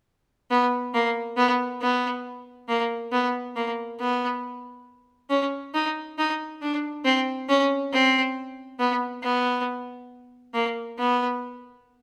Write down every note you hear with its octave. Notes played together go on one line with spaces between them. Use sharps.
B3
A#3
B3
B3
A#3
B3
A#3
B3
C#4
D#4
D#4
D4
C4
C#4
C4
B3
B3
A#3
B3